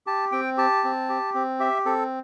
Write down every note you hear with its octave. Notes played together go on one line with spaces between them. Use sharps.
G4 A5
C4 G5
G4 A5
C4
G4
C4
G4 E5
C4 A4